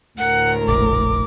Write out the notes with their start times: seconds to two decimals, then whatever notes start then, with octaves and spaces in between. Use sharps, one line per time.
0.18 D2 A2 A#4 F#5
0.68 F1 A#1 D6